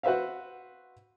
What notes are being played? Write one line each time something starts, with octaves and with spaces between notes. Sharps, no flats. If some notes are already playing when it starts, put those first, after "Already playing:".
F#4 B4 C5 E5 F5